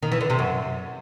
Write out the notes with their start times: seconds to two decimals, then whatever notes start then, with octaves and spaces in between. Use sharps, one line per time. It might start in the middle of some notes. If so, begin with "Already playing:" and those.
0.03 D#3
0.12 E3
0.21 D3
0.30 C3
0.39 F#2